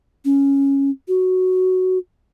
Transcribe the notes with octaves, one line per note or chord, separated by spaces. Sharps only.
C#4
F#4